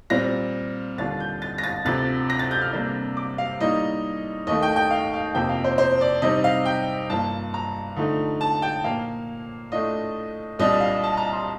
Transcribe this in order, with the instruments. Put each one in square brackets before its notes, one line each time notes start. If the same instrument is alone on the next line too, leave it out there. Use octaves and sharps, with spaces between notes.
[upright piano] A#2 G3 C4 F4 A#6
D#2 D3 G3 D4 F4 A6
G6
A6
A#6
A6
D2 C3 F3 A6
A#6
A6
G6
F6
C3 G3 A#3 D4
D6
F5
A2 G3 A#3 D#4 D#5
D#2 D#3 A3 D#5
G5
G5
F5
F5
F2 C3 F3 A#3 G5
F5
C5
C5
D5
C3 G3 C4 D#4 D#5
F5
G5
G2 F3 A#3 F4 A5
A#5
D3 F3 A3 D#4
A5
G5
A#2 F3 A#3 F5
A2 A3 D4 F4 D#5
C2 A#2 G3 D4 D#5
F5
A5
A#5
C6